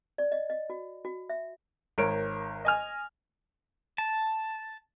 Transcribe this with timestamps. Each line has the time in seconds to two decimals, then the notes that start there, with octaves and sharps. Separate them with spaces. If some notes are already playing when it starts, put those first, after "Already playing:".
0.18 D5
0.32 D#5
0.50 D#5
0.70 F#4
1.05 F#4
1.29 E5
1.98 G#1 A#4 C#5 D7
2.65 D#5 G#5 F6
3.98 A5